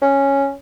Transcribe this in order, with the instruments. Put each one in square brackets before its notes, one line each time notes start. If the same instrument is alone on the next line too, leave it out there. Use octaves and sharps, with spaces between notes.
[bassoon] C#4